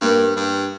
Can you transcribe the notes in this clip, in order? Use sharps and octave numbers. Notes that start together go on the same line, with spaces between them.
G2 A#3
G2